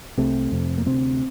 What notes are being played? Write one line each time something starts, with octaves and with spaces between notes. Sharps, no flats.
C2 C3 A3 C4
F2 C3
A#3
D2 C3 A3 C4